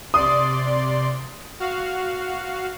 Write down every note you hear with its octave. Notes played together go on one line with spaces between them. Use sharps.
C3 D5 C6 D#6
F#4 F5